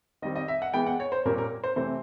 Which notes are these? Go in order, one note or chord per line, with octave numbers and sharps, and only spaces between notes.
D#3 G3 C4 D#5
D#5
E5
F#5
E3 G#3 B3 G5
F#5
C#5
C5
A#2 G3 A#3 C#4 A#4
A#4
C5
C3 E3 A3 C4 C5